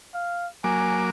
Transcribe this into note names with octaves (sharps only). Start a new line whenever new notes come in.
F5
F#3 A#3 G#5 D6